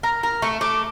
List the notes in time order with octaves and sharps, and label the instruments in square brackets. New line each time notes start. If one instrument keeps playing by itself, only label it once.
[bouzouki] A#4 [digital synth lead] A#5
[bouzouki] A#4 [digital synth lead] A#5
[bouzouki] A3 [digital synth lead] C#6
[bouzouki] A3 [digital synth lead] D6